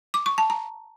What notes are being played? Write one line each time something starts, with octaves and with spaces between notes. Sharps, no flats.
D6
C#6
A5
A#5